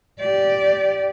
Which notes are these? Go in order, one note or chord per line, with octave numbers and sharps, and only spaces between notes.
G4 D5